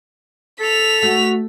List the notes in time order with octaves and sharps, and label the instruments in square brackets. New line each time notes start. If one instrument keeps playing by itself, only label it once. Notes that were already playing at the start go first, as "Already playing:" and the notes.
[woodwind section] A4 [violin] B6 F7
[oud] A3 [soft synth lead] F#4